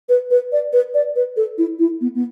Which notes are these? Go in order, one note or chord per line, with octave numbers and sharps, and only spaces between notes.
B4
B4
D5
B4
D5
B4
A4
E4
E4
B3
B3